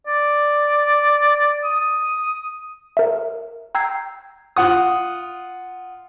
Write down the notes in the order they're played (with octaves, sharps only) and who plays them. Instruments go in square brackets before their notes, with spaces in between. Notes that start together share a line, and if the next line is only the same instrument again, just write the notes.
[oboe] D5
D#6
[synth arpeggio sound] A#4 E5
G5 A#5 E6 G6 G#6 C7
[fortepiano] F4 F#5 D#6